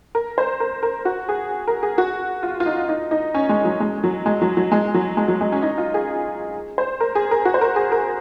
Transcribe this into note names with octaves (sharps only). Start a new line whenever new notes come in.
A#4
C5
A#4
A#4
F#4
G#4
A#4
G#4
F#4
F4
F4
D#4
D#4
D#4
C#4
G#3
F#3
G#3
F#3
G#3
F#3
F#3
G#3
F#3
G#3
F#3
G#3
C#4
D#4
F4
G#4
C5
A#4
G#4
A#4
F#4
C5
A#4
G#4
A#4